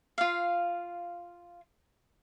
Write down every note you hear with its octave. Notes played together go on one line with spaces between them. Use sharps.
F4 F5